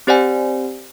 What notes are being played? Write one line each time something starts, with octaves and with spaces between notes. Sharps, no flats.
C4 G4 C5 D5 F#5 G#5